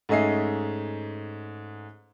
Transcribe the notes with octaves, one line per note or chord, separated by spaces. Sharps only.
G#2 A3 C#4 D#5 E5 C7